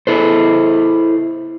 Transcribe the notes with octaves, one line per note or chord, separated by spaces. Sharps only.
E4 A4 C5